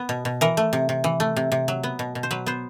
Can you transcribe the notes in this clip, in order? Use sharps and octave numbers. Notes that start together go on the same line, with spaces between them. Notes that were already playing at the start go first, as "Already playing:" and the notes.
Already playing: B3
B2
B2
E3 A#4
A3
C3
C3
E3
A3
C3
C3
F#3
B3
B2
B2
C5
F#3 B4
B3 C5